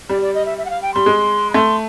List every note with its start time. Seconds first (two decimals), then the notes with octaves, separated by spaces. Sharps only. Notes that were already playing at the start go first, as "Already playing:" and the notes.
0.09 G3 D5
0.22 D5
0.34 D#5
0.46 E5
0.58 E5
0.65 F#5
0.70 F5
0.82 G5
0.94 G3 C6
1.06 G#3
1.50 B5
1.54 A3 C6